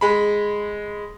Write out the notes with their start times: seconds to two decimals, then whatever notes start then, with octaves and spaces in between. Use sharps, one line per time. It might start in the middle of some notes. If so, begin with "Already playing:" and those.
0.01 G#3 B5